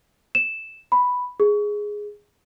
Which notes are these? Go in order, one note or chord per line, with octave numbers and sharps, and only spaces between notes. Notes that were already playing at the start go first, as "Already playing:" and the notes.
E7
B5
G#4